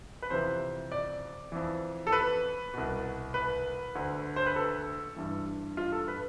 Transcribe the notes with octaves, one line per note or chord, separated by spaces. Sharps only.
B4
F2 C3 E3 C5
D5
F2 E3
A4
B4
C2 B2
B4
D2 D3
C5
B4
A4
G2 E3
F4
A4
B4